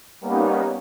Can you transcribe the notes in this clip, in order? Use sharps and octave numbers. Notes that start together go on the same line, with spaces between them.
G3 A#3 B3 C#4 D#4